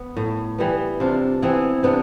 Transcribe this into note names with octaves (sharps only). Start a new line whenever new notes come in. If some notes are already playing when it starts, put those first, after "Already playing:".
Already playing: B3
A2
E3 G3 B3
C3 D4 F4
E3 B3 C4 E4
C3 B3 D4